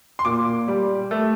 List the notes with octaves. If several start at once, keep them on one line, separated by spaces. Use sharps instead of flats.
C6
A#2 D6
G3
A3